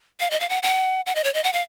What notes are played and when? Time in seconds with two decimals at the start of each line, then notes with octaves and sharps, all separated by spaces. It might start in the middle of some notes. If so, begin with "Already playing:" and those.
0.20 F5
0.31 D#5
0.40 F5
0.49 F#5
0.63 F#5
1.06 F#5
1.15 D#5
1.24 C#5
1.34 D#5
1.44 F#5
1.53 F5